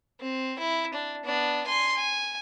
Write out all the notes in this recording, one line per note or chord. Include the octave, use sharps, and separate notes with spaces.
C4
E4
D4
B3 D4
G#5 C6
G#5